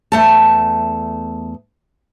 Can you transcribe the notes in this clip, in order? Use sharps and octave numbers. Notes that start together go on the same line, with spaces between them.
E2 A3 A5